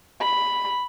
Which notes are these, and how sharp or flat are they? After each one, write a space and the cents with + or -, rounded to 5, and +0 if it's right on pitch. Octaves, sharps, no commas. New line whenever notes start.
B5 +0